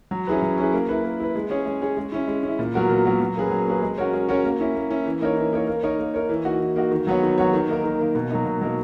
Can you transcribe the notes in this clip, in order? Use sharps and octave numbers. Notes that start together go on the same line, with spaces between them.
F#3
C#4 E4 G#4 B4
F#3
C#4 E4 G#4 B4
A#3
E4 B4
A#3
E4 B4
G#3
C#4 G#4 C#5
G#3
C#4 G#4 C#5
G#3
C#4 E4
G#3
C#4 E4
A#2
F#3 B3 F#4 A#4
A#2
F#3 B3 F#4 A#4
F#3
A#3 C#4 G#4 B4
F#3
A#3 C#4 G#4 B4
G#3
C#4 F#4 A#4 C#5
G#3
C#4 F#4 A#4 C#5
A#3
C#4 E4
A#3
C#4 E4
E3
A#3 D#4 A#4 C#5
E3
A#3 D#4 A#4 C#5
A#3
D#4 A#4 C#5
A#3
D#4 A#4 C#5
E3
A#3 D#4 F#4
E3
A#3 D#4 F#4
D#3
F#3 B3 F#4 C#5
D#3
F#3 B3 F#4 C#5
D#3
A#3 D#4 A#4
D#3
A#3 D#4 A#4
B2
F#3 A#3 D#4
B2
F#3 A#3 D#4